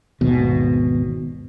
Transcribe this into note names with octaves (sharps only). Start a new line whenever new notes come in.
G#1 D#2 B2